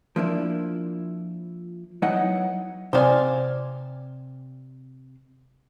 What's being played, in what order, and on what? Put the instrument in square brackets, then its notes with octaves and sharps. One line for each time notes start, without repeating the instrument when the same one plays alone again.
[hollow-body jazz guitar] F3 A#3 D4 E4
F#3 B3 D#4 E4 D#5 F#5
[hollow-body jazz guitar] C3 F5 [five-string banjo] C5 D5 G#5